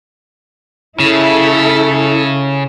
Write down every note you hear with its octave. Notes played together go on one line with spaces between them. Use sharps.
C#3 E4 A4